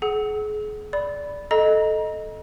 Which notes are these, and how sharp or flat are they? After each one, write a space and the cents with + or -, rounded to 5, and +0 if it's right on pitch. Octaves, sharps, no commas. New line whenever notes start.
G#4 +35 F#5 +20 E6 -30
D5 -5 B5 +0
A4 -10 D#5 +0 A#5 +30